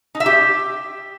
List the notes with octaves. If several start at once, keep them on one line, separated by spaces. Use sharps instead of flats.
D#4
E5
G4